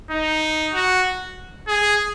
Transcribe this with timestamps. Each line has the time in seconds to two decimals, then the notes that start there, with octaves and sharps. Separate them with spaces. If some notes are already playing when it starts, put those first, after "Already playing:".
0.11 D#4
0.74 F#4
1.68 G#4